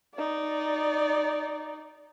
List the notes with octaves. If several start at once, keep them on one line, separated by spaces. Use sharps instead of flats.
D#4 D5